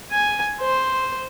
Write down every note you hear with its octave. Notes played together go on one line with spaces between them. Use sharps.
G#5
C5